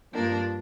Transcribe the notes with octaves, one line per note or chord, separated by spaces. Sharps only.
G2 F3 A#3 D4